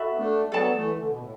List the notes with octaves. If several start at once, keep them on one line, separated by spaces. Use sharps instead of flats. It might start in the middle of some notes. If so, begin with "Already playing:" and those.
Already playing: F#4 A4 E5 B5
B3
A3 D4
F#3 B3 A4 D5 A5
E3 A3
D3
B2
A2